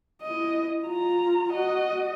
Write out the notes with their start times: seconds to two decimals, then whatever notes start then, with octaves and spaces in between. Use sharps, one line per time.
0.23 E4 D#5
0.85 F4 A#5
1.51 F#4 D#5